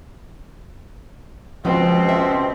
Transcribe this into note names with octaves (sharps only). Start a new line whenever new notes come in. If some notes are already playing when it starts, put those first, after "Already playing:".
C#2 B2 F3 C4
E5